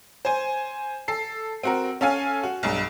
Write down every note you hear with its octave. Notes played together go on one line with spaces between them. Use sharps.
C5 G#5
A4 C7
C4 F#4 A#4
C#4 A4 F5 G#5
F#4
B1 G2